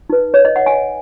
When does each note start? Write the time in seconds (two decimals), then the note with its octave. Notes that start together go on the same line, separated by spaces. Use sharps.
0.10 D#4 B4
0.34 C#5
0.45 D#5
0.56 F#5
0.66 G#5